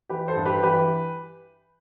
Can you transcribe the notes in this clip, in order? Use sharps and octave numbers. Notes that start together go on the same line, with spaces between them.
E3 G4 B4
A4 C5
G2
G4 B4
E3 G4 B4